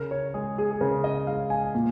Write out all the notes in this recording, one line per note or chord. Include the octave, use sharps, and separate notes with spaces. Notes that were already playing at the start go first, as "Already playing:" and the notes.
Already playing: C#3 A#4
C#5
G#3 G#4
G#4
G#4
C#3 A#4
D#5
G#3 F5
G#5
A#2